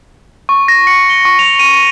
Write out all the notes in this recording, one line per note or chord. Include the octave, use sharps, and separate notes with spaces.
C#6
A#6
C#7
G7
C#6
F7
D#7